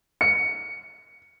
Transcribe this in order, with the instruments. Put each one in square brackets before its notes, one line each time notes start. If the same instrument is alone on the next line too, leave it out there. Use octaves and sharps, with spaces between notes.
[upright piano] C#7